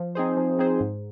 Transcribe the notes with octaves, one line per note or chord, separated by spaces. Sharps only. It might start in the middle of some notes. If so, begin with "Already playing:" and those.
Already playing: F3
C4 D#4 G#4 C5
F3
C4 D#4 G#4 C5
G#2